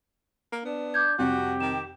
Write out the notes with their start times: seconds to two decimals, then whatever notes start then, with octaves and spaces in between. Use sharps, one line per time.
0.52 A#3
0.65 B3 D4
0.94 D6 G6 G#6
1.18 F2 C3 G3 F#4 G4 F#6
1.60 D#3 E7